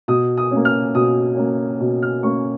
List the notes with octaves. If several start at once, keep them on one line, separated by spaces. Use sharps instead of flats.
B2 D#6
D#6
A#3 C#4
F6
B2 D#6
A#3 C#4
B2
F6
A#3 C#4 C#6